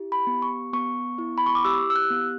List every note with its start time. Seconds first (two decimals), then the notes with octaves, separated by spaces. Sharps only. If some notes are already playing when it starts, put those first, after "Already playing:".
Already playing: E4 G4
0.12 B5
0.27 B3
0.42 C#6
0.73 B3 C#6
1.18 E4
1.38 B5
1.46 C#6
1.55 D6
1.65 G4 E6
1.90 E6
1.96 F#6
2.10 B3